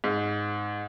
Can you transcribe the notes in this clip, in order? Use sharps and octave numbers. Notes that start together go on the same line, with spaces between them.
G#2